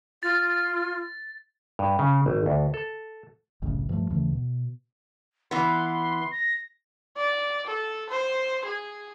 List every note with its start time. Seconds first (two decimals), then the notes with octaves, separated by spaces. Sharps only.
0.23 F4 A6
1.79 G2
1.99 C#3
2.26 G#1
2.46 D2
2.74 A4
3.62 F#1 C2 A2 C#3
3.89 G2 F3 F#3 A3
4.10 D#2 C#3 E3 A3
4.32 B2
5.51 E3 B3 C6
6.31 A#6
7.17 D5
7.66 A4
8.09 C5
8.65 G#4